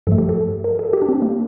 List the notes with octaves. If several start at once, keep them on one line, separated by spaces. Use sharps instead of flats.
G2 F3 A3 A4
G4
A4
A#4
A4
G4
D4
C4
A#3